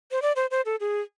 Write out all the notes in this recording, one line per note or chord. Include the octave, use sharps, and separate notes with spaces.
C5
D5
C5
C5
A4
G#4